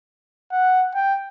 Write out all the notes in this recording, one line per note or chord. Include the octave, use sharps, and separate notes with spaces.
F#5
G5